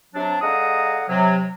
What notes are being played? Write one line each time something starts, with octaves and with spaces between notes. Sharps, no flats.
C3 F#3 D4
D3 G#3 F5 F#5 A#5 D#6
C3 F#3